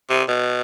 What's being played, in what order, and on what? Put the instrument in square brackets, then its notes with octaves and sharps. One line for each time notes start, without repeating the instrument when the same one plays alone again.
[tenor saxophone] C3
B2